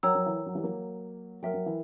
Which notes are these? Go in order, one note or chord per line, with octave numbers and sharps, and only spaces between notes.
F#3 A#4 C#5 G5 A#5 E6
F#3
E3
F#3
E3 G3
F#3 A#3
F#3 A#3 A#4 E5 G5
F#3
E3